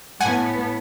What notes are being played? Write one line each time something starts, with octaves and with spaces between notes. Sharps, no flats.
A2 B3 F#5 G#5